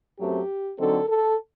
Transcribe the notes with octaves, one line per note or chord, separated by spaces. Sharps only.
F#2 F#3 A3 C4 G4
D3 F#3 C4 D#4 A4
A4